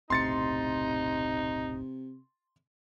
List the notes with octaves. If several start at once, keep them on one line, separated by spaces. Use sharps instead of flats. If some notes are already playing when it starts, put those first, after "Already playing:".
D#1 B1 A2 C3 D#4 C6 A6 C#7